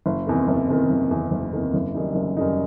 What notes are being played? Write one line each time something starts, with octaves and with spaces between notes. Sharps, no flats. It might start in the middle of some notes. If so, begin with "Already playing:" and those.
F#1
E2 C3 D#3
F#1
E2 C3 D#3
F#1
E2 C3 D#3
F#1
E2 C3 D#3
F#1
F#2 D#3 G3 D#4
F#1
F#2 D#3 G3 D#4